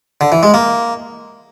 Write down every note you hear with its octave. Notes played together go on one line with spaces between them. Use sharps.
D3
E3
G#3
A#3